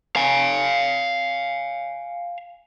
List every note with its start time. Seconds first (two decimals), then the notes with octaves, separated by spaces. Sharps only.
0.16 F5 G#5